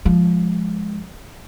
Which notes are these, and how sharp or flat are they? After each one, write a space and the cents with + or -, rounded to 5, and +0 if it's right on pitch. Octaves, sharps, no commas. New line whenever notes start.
F3 +0 G#3 +0